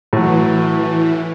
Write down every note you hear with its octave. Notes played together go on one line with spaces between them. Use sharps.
A2 E3 F#3